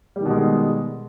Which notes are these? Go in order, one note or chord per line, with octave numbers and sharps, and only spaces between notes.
B2 D#3 G3 G#3